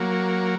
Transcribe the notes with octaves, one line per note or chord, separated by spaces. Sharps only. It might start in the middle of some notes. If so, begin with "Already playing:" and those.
Already playing: F#3 A#3